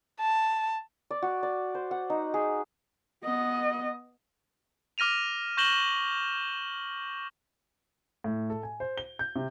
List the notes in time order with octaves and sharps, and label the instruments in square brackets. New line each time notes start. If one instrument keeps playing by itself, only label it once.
[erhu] A5
[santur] D5
F#4
D5
C5
F#5
D#4
G#4
[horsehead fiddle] B3 D#5
[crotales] D6 F6 A#6 D#7 F7
C#6 G6 A#6 E7 F#7 G7
[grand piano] A2
A4
G#5
C5
G7
G6
C3